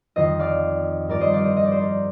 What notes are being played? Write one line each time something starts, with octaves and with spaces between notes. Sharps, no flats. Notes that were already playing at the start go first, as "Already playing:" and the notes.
F2 D#3 C5 D#5
D5 F5
G2 F3 A#4 D5
C5 D#5
D5 F5
C5 D#5
D#5
D5
C5
A#4 D5